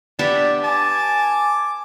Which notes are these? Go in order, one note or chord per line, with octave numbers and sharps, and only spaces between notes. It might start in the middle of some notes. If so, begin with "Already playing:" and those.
B3 D4 G4 E5
G#5 A5 D6